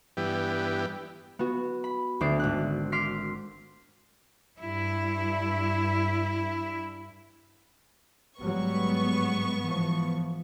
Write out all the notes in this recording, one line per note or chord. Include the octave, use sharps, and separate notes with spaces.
G2 E3 B3 G4
B3 F#4
B5
D2 C4 D4 D6 C7
G#1 D5 F#6
C6 D6 F6 B6 C7
G2 E4
G#2 F#3 G3 B3 C#6
E3 F3